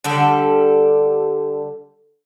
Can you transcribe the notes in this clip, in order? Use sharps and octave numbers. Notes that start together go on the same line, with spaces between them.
D3 G3 A4